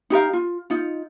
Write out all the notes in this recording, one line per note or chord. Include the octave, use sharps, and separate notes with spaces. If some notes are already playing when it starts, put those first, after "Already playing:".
D#4 G4 A#4 F5
F4
D#4 F4